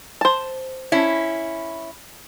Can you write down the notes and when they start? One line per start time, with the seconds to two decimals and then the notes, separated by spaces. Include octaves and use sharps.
0.21 C5 A5
0.92 C#4 E4